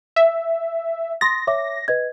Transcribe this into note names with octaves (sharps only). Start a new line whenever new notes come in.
E5
C6 D#6 A6 A#6
C#5 E5 D6
B4 D#5 G#6